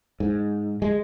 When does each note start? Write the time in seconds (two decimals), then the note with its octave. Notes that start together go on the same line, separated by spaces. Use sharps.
0.20 G#2
0.82 G#3